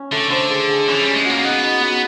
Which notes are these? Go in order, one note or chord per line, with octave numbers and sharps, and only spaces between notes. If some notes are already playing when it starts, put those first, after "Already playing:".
Already playing: C#4
D3 A3
D3 C5
G#4
G#4
E3 C#4
G3 C#4
G#3
A#3 F#4
B3 D#4
D#4
F#4